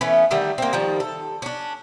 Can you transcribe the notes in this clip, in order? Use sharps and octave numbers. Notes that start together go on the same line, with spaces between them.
E3 A3 B3 C#4
D3 D#3 G3 A3
A#3 C4
D#3 F3 G3
A4
C#4 D4